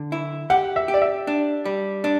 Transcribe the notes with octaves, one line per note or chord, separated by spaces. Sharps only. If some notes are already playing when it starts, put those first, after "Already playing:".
Already playing: D3
E4
G4 F#5
E5
G4
D5
E5
D4
G3
D4